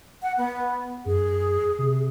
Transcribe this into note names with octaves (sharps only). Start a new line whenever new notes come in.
F#5
B3
F#2 G#4
C3